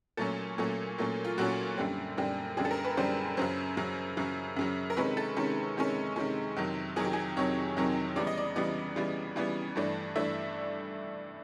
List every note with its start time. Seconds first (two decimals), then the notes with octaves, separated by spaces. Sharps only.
0.17 A#2 F#3 A3 C#4 A4
0.58 A#2 F#3 A3 C#4
0.98 A#2 F#3 A3 C#4
1.24 F4
1.38 A#2 F#3 A3 C#4 F#4
1.77 F#2 D3 G3 C4
2.17 F#2 D3 G3 C4
2.57 F#2 D3 G3 C4 G#4
2.65 A4
2.71 A#4
2.84 B4
2.97 F#2 D3 G3 C4 C5
3.37 F#2 C#3 F#3 C5
3.77 F#2 C#3 F#3
4.17 F#2 C#3 F#3
4.56 F#2 C#3 F#3
4.90 A#4
4.97 C3 D#3 G#3 C#4 B4
5.17 A4
5.37 C3 D#3 G#3 C#4
5.77 C3 D#3 G#3 C#4
6.16 C3 D#3 G#3 C#4
6.57 F2 C3 D#3 F#3
6.96 F2 C3 D#3 F#3 G#4
7.05 G4
7.13 G#4
7.37 F2 C3 D#3 F#3 C#5
7.77 F2 C3 D#3 F#3
8.16 C#3 E3 G3 B3 D5
8.27 D#5
8.37 D5
8.56 C#3 E3 G3 B3 D5
8.96 C#3 E3 G3 B3
9.36 C#3 E3 G3 B3
9.76 G2 E3 A3 D4
10.16 G2 E3 A3 D4 E5